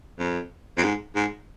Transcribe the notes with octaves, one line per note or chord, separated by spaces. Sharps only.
F2
F2
G#2
G#2